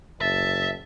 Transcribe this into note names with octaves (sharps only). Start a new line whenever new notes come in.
F#1 E5 A5